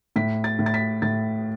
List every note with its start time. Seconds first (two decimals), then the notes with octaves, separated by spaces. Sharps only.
0.16 A2 B6
0.44 A6
0.59 A2
0.66 A6
0.74 B6
1.02 A2 A6